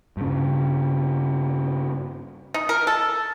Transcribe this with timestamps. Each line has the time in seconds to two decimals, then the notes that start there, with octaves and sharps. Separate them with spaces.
0.17 G2 C#3
2.54 D#4
2.69 A#4
2.87 A4